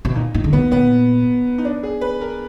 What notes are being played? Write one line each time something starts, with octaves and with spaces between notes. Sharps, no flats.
B2
A#2 D#4
A#2 D#4
D3
B2 B3
A#2 B3
D#4
D4
G#4
B4
A#4